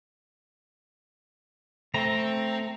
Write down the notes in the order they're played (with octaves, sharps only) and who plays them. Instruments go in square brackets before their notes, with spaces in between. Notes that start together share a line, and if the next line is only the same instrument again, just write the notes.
[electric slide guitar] A3 [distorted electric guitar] C4 [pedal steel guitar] A#5